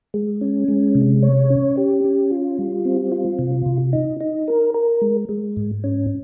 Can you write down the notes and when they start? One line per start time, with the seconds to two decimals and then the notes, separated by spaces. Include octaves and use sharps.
0.14 G#3
0.41 C#4
0.68 G#3
0.95 C3
1.22 C#5
1.50 C#4
1.77 G4
2.04 C#4
2.31 F4
2.59 G3
2.85 C4
3.12 F4
3.39 C3
3.66 C3
3.93 D#4
4.21 D#4
4.48 A#4
4.74 A#4
5.02 G#3
5.29 G#3
5.57 G#2
5.84 C#4